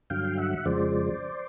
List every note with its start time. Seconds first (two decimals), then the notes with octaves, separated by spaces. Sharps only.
0.10 G2 D3 F#3 F5 G5
0.38 E5 F#5
0.65 F2 C#3 F3 G#3 C5 D5